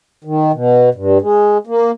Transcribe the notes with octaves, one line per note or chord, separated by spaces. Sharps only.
D#3
B2
G2
G#3
A#3